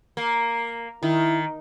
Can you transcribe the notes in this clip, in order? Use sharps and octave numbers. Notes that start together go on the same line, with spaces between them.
A#3
D#3 E4